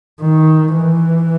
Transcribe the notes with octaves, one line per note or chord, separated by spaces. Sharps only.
D#3
E3